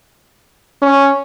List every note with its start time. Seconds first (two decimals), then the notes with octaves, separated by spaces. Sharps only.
0.82 C#4